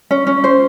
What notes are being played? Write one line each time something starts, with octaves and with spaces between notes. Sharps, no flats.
C#4
C#4
C5